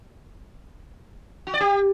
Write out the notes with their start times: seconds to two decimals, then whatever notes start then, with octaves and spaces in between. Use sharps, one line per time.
1.47 F#4
1.54 D5
1.61 G4